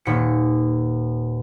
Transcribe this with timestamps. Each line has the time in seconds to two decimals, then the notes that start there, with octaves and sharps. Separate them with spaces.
0.05 D#1 C#7